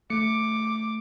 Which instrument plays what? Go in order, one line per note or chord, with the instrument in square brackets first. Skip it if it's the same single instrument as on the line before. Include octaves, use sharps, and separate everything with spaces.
[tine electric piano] A3 C#7 [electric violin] D6